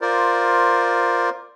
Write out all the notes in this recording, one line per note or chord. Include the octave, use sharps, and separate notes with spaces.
F4 A#4 C5 D5